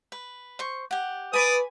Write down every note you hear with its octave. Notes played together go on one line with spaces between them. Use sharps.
B4
C5 C#6
G4 F#5
B4 D5 G#5 B5 D#6